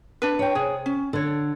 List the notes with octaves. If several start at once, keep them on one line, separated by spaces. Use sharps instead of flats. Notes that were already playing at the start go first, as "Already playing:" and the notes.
D4 B4
C#5 G5
C3 G#4
C#4
D3 A4 C#5